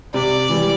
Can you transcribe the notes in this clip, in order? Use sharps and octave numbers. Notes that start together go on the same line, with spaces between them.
C3 D5
E3 G3